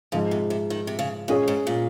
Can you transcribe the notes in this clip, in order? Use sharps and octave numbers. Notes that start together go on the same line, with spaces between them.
G#2 C#3 F3 G#3
C3
C3
D#3
C3
C#3
A#2 G#3 C#4 G#4 C#5
G#2
A#2